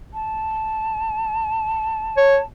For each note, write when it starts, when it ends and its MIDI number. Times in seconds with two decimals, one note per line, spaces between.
0.14 2.45 81
2.17 2.39 73